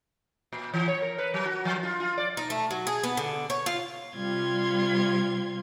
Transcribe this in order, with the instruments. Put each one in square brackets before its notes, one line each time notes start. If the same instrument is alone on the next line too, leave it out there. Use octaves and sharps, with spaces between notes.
[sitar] A#2
E3
C#5
A#4
B4
F#3
F#4
F3
F4
F4
D5
[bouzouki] D#4
A3
F#3
G#4
B3
D3
C#5
F4
[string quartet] C3 G3 F4 C6 G#6